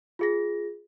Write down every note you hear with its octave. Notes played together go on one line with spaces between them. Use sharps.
F4 G#4 A#6